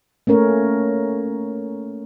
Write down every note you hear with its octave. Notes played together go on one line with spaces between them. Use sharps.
A3 A#3 C#4 A#4 C#5